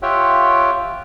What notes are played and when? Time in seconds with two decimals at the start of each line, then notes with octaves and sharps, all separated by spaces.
0.02 F4 G4 C#5 E5 F#5 G5